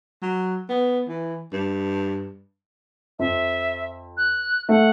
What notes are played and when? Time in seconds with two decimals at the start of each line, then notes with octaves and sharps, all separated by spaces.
0.22 F#3
0.69 B3
1.08 E3
1.53 G2
3.19 F2 E5
4.17 F#6
4.69 A3 F#5